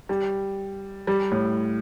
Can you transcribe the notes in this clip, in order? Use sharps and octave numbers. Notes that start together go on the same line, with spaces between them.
G3
G3
A2